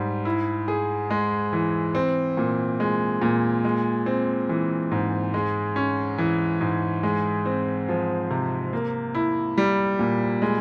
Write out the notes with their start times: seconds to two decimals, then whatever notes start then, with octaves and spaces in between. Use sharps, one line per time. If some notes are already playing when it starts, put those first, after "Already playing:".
Already playing: G#2 G3
0.25 E4
0.68 G#4
1.10 G#3
1.53 E3
1.95 C4
2.37 A#2
2.80 G#3
3.21 A#2
3.65 G#3
4.06 C4
4.49 E3
4.91 G#2
5.34 G#3
5.76 C#4
6.18 E3
6.61 G#2
7.03 G#3
7.46 C4
7.89 F3
8.30 C3
8.73 A#3
9.15 E4
9.58 G3
9.99 A#2
10.42 G#3